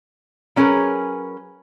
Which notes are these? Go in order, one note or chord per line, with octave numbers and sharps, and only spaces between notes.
F#3 C#4 G#4 A#4 B4